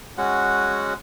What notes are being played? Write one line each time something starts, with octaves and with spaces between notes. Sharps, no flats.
G#3 C#4 F#4 F#5